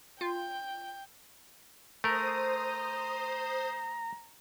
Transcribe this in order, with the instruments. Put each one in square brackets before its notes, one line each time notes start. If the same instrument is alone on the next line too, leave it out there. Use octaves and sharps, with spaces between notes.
[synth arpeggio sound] F4 [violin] G5
[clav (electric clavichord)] A3 A#4 [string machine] C5 D#6 [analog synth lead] A#5